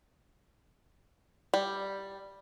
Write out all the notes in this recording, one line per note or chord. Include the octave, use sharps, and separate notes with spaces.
G3